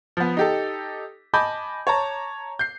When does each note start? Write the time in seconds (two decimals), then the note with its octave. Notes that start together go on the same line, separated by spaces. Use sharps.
0.17 F3 B3
0.37 D#4 G4 A4
1.34 D#5 G#5 A5 B5 D6 G6
1.87 C#5 A5 A#5
2.59 G6 C7